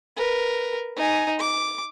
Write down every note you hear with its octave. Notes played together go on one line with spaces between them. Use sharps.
A#4 B4
D#4 G#5
D6